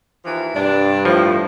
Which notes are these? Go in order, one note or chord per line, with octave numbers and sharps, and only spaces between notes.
D#2 E3 F3
G2 C3 D4
A2 F3